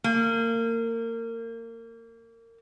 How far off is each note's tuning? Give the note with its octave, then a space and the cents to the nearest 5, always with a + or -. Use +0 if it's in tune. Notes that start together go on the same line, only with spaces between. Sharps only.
A#3 -30